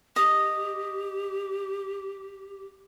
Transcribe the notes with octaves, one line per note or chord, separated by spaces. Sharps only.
G4 D#5